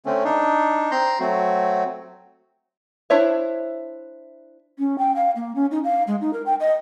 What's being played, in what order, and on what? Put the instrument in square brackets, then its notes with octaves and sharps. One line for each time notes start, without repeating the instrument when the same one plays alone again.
[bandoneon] D3 A3 C4 C#4
D4 D#4
C4 A#5 C6 G6
F#3 A3 C4 F#4
[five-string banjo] D4 E4 C5 C#5 E5
[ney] C#4
G5
F5
A#3
C#4
D#4
F5
G#3
D#4
A#4
G5
D#5